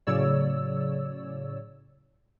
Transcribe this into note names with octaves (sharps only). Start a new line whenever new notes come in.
A2 C#3 F#3 C#5 D5 E6